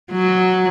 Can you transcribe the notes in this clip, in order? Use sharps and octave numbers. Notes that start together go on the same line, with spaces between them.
F#3